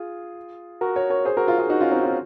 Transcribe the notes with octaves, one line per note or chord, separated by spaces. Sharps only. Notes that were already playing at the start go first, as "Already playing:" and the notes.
Already playing: F4 G#4
F#4 A#4
A#4 C#5
A#4 C#5
G#4 C5
F#4 A#4
F4 G#4
F4 G#4
D#4 F#4
C#4 F4
C4 D#4
C#4 F4